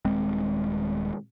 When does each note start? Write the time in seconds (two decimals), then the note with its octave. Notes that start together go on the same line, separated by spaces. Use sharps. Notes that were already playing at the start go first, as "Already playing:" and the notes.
0.05 D#1 G#3 C4